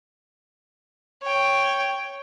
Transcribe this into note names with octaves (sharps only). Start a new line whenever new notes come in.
C#5 G5